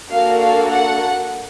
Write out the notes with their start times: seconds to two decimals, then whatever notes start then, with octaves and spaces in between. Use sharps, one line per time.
0.10 A#3 D4 F#4 A4 F5
0.39 F5
0.68 F#5